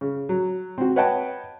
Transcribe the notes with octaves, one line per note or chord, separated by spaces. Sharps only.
C#3
F#3
C4 F#4
B4 C#5 D#5 F#5 G5 A5